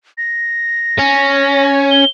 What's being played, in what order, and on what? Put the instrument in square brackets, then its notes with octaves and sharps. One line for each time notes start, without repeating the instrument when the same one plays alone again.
[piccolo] A#6
[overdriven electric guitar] C#4
[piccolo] G7